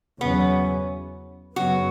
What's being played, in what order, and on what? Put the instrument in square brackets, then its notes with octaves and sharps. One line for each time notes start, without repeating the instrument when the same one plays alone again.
[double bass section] E2 C#3 F#3 C#4 [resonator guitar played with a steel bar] B3
[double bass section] F#2 C#3 F#3 B3 [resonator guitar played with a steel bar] F#4